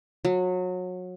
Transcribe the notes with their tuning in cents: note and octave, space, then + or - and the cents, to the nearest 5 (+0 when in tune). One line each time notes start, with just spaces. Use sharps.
F#3 -25